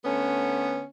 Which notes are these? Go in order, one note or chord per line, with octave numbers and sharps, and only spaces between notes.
D3 A3 B3 C#4